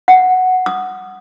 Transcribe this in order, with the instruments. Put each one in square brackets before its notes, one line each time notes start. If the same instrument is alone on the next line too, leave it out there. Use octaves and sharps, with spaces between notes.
[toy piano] F#5
D#6